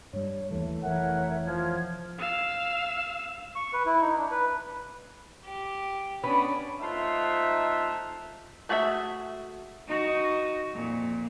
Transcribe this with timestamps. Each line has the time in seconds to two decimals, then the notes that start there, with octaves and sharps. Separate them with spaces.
0.13 G2 G3 C#5
0.51 D#2 E3 A3
0.83 F1 E3 A#4 C#5 E5 F#5
1.47 F3 F6 G#6
2.19 F5 E6
3.56 C#6
3.73 B4
3.86 E4
4.02 D#4
4.18 D4
4.31 B4
5.46 G4
6.24 B3 C#4 D4
6.82 A3 D#4 F4 C5 E5 F#5
8.69 A3 F#4 G#4 A4 E5
9.87 D#4 F#4
10.73 F2 A#2